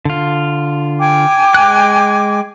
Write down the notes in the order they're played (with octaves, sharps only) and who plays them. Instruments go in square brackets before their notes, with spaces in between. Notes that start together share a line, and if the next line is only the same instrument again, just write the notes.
[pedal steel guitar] D3 F4
[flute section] G5 G#5 D6
[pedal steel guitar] G#3 F#6